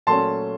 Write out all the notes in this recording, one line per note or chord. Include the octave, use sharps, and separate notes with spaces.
A#2 F#3 A3 C#4 A5 C6